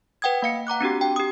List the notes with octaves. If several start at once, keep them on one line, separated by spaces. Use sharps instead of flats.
B4 F#5 G5 D#6 G#6
A#3 F5 C#7
F#5 A#5 D6 F#6
C4 D4 F#4 G4
G5
G4 D#6